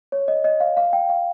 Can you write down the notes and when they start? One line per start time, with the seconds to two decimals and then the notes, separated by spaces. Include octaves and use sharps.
0.12 C#5
0.28 D#5
0.44 D#5
0.60 F5
0.77 F5
0.93 G5
1.09 F5